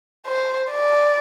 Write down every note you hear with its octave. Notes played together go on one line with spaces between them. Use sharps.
C5
D5